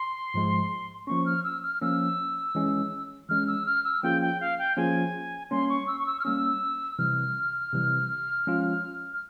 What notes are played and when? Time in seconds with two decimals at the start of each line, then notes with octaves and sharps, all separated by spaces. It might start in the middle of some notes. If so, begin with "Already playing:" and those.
Already playing: C6
0.34 G#2 F3 G#3
1.07 F3 A#3 C#4 C#6
1.26 F6
1.44 E6
1.62 F6
1.81 F3 A#3 C#4 E6
2.55 E3 G#3 C#4
3.29 E3 G#3 C#4 F6
3.47 E6
3.66 F6
3.84 E6
4.03 F3 A#3 C#4 F4 G#4 G5
4.22 G5
4.41 F5
4.59 G5
4.77 F3 A#3 C#4 F4 G#4 G#5
5.51 G3 A#3 C#4 C6
5.69 C#6
5.87 E6
5.99 C#6
6.07 E6
6.20 F6
6.25 G3 A#3 C#4 E6
6.98 C3 E3 G3 F6
7.73 C3 E3 G3
8.47 F3 G#3 C#4 F4
9.13 F6